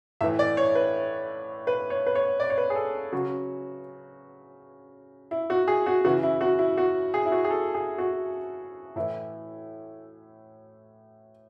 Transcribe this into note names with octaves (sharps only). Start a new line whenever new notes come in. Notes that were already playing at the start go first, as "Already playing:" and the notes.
A2 E3 E5
D5
C#5
B4
B4
C#5
B4
C#5
D5
C#5
B4
G#4
A4
C#3 F#3 F#4
E4
F#4
G#4
F#4
C#3 E3 F#4
E4
F#4
E4
F#4
G#4
E4
F#4
G#4
A4
G#4
F#4
A2 E3 E4